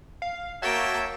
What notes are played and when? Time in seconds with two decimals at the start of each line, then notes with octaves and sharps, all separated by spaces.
0.22 F5
0.62 A#3 F#4 C#5 E5 G5 A5